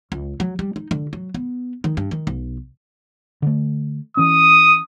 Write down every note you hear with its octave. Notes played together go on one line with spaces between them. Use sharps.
C#2
F#3
G3
D#4
D3
F#3
B3
D#3
G2
D#3
B1
D3 A3
E3 C#4 D#6